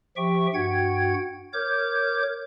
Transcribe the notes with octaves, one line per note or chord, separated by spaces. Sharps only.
F3 G4 E5 G5 C#6
G2 F#4 F#5 G5 G#6
A#4 C#5 D6 G6